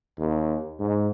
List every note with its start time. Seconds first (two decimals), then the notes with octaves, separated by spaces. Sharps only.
0.19 D#2
0.79 G#2